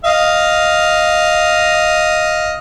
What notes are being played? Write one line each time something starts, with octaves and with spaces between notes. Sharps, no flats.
D#5 F5